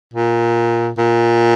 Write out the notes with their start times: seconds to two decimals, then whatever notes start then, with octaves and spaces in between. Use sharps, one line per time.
0.14 A#2
0.98 A#2